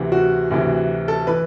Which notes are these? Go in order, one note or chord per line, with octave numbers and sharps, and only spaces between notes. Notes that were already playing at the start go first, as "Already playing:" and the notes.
Already playing: D2 C3 E3
F#4
D2 C3 E3
A4
E3 B4